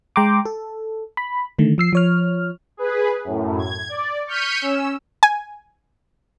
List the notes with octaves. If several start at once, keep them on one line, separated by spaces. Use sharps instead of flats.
G#3 G5 A#5 C6 D6
A4
B5
D3 D#3 A3
F3 E6 C7
F3 C#5 F6
G#4 B4
F#2 A2
G#6
D5
C#6 F6 G6 B6 C#7 D#7
C#4 E6
G#5